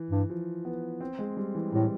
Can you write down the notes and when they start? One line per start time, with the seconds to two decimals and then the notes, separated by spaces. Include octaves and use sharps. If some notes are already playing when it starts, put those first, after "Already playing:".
Already playing: E3
0.11 G2
0.30 F3
0.65 B3
1.01 C4
1.19 G#3
1.37 G3
1.55 E3
1.72 A2 G3